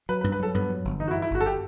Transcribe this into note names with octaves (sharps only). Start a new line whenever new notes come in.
F#3 B4
B4
G2
B4
F#3 A4
G2 B3
F#3
G1
E3 D#4
F#4
E4
G2
E4
G1 F#4
A4
G4